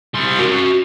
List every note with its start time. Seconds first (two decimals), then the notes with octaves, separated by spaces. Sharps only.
0.14 G3 C6
0.39 F#4 A#4